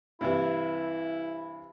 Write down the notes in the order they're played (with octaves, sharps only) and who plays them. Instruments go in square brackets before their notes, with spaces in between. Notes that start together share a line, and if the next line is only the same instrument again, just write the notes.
[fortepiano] G2 C3 E3 [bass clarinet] E4